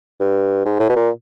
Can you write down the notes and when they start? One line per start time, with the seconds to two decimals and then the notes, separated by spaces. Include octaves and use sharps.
0.20 G2
0.65 G#2
0.80 A2
0.89 B2
0.96 A#2